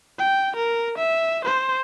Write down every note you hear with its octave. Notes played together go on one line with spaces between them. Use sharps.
G5
A#4
E5
C5